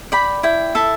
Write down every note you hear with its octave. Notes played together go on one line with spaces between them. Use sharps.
D5 G5 B5
E4 G5
A4 E5 A5